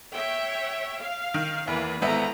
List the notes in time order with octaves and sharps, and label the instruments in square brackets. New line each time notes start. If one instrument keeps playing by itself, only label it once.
[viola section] C#5 E5 G5
F5
[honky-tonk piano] D#3
[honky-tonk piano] E2 [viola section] E3 A#3 B4
[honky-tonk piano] G#1 B3 E5 [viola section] E4 A4 A#5